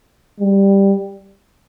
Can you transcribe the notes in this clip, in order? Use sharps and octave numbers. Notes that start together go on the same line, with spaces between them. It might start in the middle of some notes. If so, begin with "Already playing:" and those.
G3